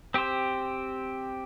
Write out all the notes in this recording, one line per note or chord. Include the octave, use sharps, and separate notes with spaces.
C4 G4 C5